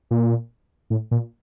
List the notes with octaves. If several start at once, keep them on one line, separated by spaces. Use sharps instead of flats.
A#2
A2
A#2